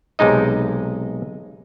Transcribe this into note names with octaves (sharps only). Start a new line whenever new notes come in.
B1 C3 G#3 D#4 D#5